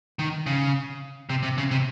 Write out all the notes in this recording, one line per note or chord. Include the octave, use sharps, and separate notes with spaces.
D#3
C#3
C3
C3
C#3
C3